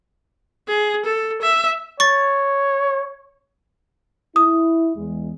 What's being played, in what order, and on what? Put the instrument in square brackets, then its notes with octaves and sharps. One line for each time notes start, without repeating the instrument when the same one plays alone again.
[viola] G#4
A4
E5
[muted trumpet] C#5 [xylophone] C#6 A6
[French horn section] E4 [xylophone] D#6
[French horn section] E2 G#3